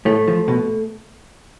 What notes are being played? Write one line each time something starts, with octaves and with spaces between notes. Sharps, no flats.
A2 A3
F3
B2